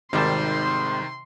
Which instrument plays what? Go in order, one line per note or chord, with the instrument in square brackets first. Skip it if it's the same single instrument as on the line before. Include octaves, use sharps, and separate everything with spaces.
[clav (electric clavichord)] G#1 G3 A5 [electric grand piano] C3 D#3 [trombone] C5 [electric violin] C6